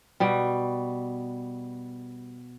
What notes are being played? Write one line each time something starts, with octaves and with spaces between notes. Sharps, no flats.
B2 G3